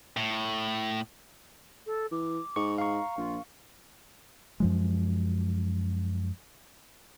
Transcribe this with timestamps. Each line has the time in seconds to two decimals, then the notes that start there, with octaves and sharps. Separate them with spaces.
0.17 A2
1.86 A4
2.11 E3 D6
2.56 G#2 C#6
2.78 F5 A#5 C#6
3.17 A#1 F4
4.60 F#2 F3 G#3